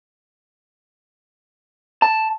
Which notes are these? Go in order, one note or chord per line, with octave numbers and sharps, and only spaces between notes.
A5